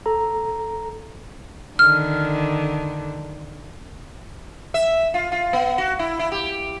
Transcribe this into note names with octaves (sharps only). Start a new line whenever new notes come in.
A4 A#5
D3 D#3 F6
E5
F4
F4
B3
F#4
E4
E4
G4